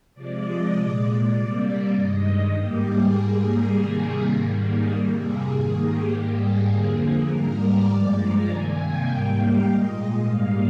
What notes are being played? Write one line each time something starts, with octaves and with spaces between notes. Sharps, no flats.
C3 F3 G#3 D5
D#5
A#2 G#3 D5
D5
C3 G3 A#3
G2 D#3 G#3 D#5
G#2 G3 A#3 G4
G#4
G#2 G3 A#3
A#4
C3 D#3 G3 A#3 G#4
G#4
G#2 D#3 G3 A#3
G#4
F2 C3 G3 A#3
G#4
G#2 D#3 A#3
G4
G#2 G3 A#3 G4
G#4
F2 D3 F3 A#3
G#2 G3 A#3 A#4
D5
G2 F3 G#3
A#5
C3 D#3 A#3 G#5
G5
G#2 G3 A#3
F5
A#2 G#3 D#5
D#5
G#2 G3 A#3 F5